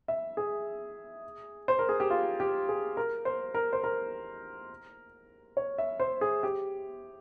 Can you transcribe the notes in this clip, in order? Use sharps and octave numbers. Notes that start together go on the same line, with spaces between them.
E5
G#4
C5
A#4
G#4
G4
F4
G4
G#4
A#4
C5
A#4
C5
A#4
C#5
E5
C5
G#4
G4